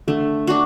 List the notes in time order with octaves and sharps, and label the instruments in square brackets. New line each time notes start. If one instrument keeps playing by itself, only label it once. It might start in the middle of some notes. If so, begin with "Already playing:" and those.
[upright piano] D3 [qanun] A3
[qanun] D4 F#4